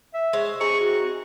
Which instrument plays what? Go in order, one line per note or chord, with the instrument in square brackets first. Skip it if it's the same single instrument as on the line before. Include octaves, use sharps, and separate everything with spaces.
[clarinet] E5
[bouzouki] G#3 C5 C#5
[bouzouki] C4 D#4 G#4 [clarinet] C#6
[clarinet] F#4